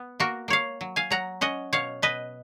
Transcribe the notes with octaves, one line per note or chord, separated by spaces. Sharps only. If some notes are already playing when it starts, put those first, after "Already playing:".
Already playing: B3
A#3 F#4 A#4
A#3 C#5 F5
F#3
F5 G#5
F#3 F#5 A#5
C#4 D#5 F#5
B2 C#5 F5
B2 B4 D#5